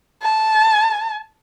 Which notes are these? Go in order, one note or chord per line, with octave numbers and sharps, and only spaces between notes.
A5